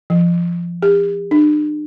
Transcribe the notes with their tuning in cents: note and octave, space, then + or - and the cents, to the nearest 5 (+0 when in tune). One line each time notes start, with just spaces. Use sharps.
F3 -20
G4 +45
D4 +45